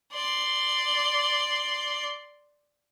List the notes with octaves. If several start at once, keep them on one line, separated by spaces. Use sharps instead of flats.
D5 C6